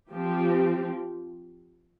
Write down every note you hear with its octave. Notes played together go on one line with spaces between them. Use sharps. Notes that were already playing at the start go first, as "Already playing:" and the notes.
F3 C4 G4